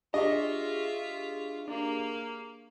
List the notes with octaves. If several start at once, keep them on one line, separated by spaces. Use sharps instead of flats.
D4 F4 G4 G#4 D#5 E5 C#6
A#3 D4